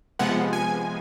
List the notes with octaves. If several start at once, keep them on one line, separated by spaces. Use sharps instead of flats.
C3 F3 G#3 B3 F#5
G#5